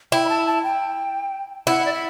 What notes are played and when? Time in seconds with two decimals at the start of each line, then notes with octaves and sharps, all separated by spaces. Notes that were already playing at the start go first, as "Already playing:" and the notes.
0.12 E4 G5
0.25 B5
0.29 A5
0.47 A5
0.64 G5
1.67 E4 F#5
1.86 D5
1.94 E5